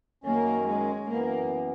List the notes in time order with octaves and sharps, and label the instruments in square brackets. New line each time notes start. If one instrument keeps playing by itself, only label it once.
[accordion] F#2 D#3 F#3 C#4 [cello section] A#3
[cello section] G#3
[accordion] F#2 E3 B3 [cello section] A#3